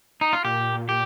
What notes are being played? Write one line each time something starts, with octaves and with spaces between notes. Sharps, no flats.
D#4
F4
A#2 G4
G4